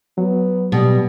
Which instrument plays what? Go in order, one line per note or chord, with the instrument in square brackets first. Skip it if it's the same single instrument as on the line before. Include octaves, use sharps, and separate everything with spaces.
[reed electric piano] F#3 [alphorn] B3
[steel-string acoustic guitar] B2 [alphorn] G3